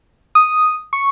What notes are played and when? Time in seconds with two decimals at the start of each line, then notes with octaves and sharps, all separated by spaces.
0.35 D#6
0.93 C#6